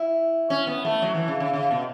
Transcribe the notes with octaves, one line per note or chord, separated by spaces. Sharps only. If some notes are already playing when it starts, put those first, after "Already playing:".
Already playing: E4
C#4
B3
A3
F#3
E3
C#3
C#3
C#3
B2